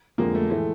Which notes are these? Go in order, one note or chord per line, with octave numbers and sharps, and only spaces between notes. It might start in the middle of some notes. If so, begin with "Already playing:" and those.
F2 D3 F3 G#3 A#3
A3
A2 E3 G#3 A3